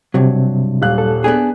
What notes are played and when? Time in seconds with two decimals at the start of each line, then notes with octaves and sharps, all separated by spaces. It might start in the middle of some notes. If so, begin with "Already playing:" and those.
0.14 G2 C3 F#3
0.82 D#1 F5 F#6
0.98 A4
1.24 B3 D4 G#4